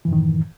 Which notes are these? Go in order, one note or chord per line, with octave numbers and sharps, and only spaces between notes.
F#2 A2 D#3 E3